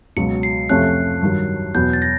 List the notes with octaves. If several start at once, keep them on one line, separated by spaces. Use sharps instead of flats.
C#2 B2 F#3 C#7
C7
F2 C3 F3 A3 C#4 F#6
G2 D#3 F#3
E2 B2 F#3 B3 G6
A6
A#6